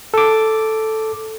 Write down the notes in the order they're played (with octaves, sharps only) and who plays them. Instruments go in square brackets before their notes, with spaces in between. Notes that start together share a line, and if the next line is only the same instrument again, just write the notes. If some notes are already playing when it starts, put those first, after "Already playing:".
[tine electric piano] A4 D6